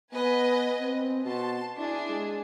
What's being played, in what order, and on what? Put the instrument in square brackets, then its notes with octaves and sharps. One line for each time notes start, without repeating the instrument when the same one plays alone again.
[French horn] B3 [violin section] B4 D#5 G#5
[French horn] C4
[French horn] B2 [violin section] A5 C6
[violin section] D4 G#4 [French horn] E4
[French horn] G#3